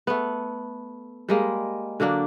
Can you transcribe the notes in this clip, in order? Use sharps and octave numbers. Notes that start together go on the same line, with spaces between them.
A3 B3
G3 G#3 A#3
D3 F#3 A#3 D4